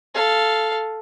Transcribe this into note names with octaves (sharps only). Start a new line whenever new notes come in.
A4 F5